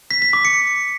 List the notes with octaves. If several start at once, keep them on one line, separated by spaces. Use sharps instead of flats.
B6
B6
D6
C#7